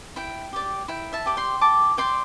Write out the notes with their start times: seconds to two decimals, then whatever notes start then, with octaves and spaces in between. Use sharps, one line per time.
0.16 E4 G5
0.53 G4 D5
0.88 E4 G5
1.13 E5 A5
1.26 G4 D5
1.37 G5 C6
1.61 G4 A5 D6
1.97 D5 G5 C6